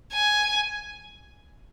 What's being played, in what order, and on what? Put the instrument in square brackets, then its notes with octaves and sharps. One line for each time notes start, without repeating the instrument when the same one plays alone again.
[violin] G#5